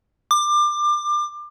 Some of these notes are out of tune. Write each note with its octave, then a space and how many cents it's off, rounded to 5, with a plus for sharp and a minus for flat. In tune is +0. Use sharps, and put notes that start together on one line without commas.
D6 +25